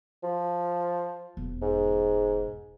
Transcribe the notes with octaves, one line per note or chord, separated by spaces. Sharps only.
F3
E1
G#2